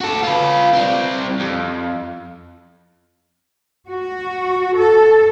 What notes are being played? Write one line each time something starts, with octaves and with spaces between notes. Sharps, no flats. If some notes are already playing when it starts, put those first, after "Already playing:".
F#4 A4
F4 B4
G3 C4
F2
F#4
A4